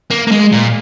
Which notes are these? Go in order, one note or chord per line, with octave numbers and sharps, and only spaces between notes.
A#3
A#3
G#3
A#2